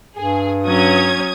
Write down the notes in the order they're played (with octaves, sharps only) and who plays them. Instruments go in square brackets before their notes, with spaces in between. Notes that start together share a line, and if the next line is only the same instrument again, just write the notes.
[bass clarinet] G2 [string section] G#4
[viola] F#3 C#4 [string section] D#6 G#6